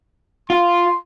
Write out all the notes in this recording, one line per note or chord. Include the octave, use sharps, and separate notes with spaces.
F4 C6